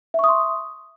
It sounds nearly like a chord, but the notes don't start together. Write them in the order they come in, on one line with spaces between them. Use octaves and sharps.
E5 C#6 D#6 C6